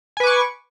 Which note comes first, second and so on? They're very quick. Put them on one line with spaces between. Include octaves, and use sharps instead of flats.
G#5 B4 D6 C#6